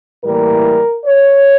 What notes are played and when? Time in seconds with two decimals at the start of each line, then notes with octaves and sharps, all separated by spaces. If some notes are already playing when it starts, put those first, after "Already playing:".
0.23 A2 E3 G3 A#3 A#4
1.05 C#5